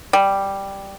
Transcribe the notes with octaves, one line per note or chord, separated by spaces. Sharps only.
G3